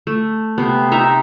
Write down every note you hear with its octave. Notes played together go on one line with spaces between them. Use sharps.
A3
C3 B3
D#4 E5 A#5